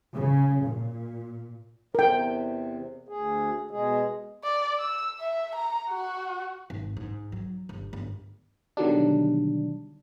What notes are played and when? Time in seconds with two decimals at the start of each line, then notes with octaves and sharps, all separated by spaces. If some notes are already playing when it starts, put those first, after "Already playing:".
0.13 C#3
0.62 A#2
1.95 E2 C3 A#4 G5
3.08 D2 G#4
3.71 B2 G#3 G#4
4.44 D5
4.79 E6
5.20 E5
5.55 A#5
5.90 F#4
6.70 G#1
6.97 G#2
7.32 F#3
7.69 G1
7.93 G1
8.77 B2 D3 D#3 F#3 G3 D4